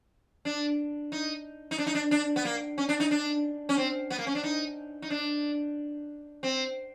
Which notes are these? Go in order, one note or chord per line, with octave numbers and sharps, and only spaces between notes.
D4
D#4
D#4
D4
D#4
D4
D4
B3
A#3
C#4
D4
D#4
D4
C#4
C4
B3
A#3
C#4
D4
D#4
D#4
D4
C4